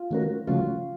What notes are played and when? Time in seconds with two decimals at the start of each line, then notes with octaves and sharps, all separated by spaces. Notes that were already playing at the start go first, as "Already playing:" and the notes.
Already playing: F4
0.11 D#3 A3 C#4 F#4 A#4
0.47 C#3 F3 A3 C#4 F4 F#4